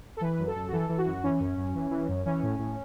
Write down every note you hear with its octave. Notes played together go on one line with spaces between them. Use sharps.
A4
E3 B4
F#2
A4
F#2
F#4
E3 A4
E3
F#4
F#2
E3 C#4
F#2
F#2
E3
E3
F#2
E3 C#4
A2
A2